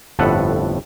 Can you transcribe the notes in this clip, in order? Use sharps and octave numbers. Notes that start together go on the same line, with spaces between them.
G1 F2 A2 A4 B4 F#5